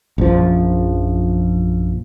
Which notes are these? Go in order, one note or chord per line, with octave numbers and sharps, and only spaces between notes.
A#1 F#2 F3